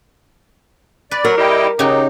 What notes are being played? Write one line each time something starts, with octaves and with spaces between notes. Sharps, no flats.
B4 D5
F#3 A#4
G3 E4 D#5 G5
C#3 D#4 F#4 G4